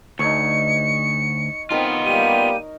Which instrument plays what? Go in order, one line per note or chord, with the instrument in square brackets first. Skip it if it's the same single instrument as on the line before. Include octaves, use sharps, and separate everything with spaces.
[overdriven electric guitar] D2 [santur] D#4 C#5 [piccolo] C#7
[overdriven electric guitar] B3 F4 [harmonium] C4 [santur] D#4 A#4
[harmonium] G3 A#3 G4 [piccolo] D#7